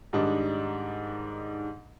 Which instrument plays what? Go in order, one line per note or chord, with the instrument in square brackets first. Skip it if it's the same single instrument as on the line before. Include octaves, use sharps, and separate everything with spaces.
[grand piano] G#2 D#3 G3 D4 D#4